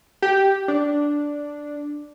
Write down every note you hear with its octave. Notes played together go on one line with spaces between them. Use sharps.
G4
D4